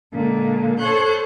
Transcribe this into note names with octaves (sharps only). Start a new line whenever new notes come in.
A#2 D3 G#3
A4 C5 C#5 C#6 F#6 G6